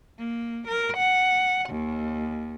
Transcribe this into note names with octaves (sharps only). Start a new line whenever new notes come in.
A#3
A#4
F#5
D#2